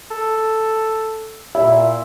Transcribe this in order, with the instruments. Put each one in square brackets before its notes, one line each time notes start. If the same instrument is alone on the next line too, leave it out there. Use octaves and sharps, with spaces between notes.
[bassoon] A4
[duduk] A#2 [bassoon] E4 [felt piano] E5